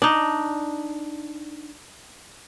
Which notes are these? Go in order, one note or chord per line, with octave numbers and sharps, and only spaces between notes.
D4 D#4